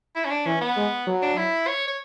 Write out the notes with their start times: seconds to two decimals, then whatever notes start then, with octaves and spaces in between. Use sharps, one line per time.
0.15 E4
0.25 C#4
0.30 D4
0.46 E3 C#4
0.61 B3
0.76 G#3
1.07 F#3
1.22 D4
1.37 E4
1.67 C#5
1.87 C#5